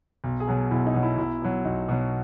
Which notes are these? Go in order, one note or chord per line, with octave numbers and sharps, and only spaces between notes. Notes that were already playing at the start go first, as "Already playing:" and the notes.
B1
G#4
B2 F#3
B1 E4
D#4
B2 F#3
E4
B1 E4
B2 F#3
B1 D#4
B2 F#3